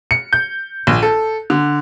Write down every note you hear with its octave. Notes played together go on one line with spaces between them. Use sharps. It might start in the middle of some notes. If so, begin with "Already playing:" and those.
C#7
G6
A#1
A4
D3